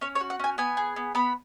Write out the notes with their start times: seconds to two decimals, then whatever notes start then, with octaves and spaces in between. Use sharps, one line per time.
0.01 C#4 C#5
0.15 C#5
0.21 F#4
0.30 F#5
0.40 C#4 G#5
0.58 B3 G#5
0.77 G#4
0.96 B3
1.15 B3 B5